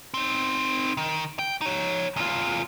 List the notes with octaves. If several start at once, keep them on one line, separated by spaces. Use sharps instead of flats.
C4 D#4
D#3
G5
D#4 C#5
E2 F4